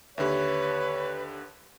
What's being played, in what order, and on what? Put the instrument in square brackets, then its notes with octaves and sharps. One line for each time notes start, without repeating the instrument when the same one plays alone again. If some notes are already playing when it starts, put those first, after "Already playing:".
[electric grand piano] D#2 D3 [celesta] G4 E5 [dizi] B4 [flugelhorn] C#5